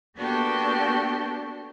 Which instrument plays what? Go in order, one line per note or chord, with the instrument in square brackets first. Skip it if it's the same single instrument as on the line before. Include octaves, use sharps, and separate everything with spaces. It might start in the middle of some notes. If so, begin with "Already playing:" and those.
[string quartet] A#3 B3 D4 F#4 G4 A4